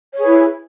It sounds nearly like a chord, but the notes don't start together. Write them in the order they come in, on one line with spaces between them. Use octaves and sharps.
C#5 G#4 B4 E4